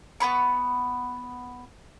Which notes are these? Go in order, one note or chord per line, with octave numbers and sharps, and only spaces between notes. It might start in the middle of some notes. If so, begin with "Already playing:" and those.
B3 G#4 B5 C#6